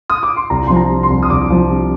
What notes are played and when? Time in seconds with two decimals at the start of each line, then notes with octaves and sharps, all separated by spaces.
0.10 D#6
0.23 D6
0.36 C6
0.50 C2 A#5
0.67 F3 C6
0.76 A#5
0.90 C3
1.03 C6
1.10 C2
1.23 D#6
1.30 C2 D6
1.50 F3
1.70 C3